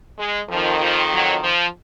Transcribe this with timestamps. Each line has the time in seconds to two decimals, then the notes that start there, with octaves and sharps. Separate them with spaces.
0.18 G#3
0.50 F2 D#3 F3
0.80 F3
1.11 F#3
1.43 F3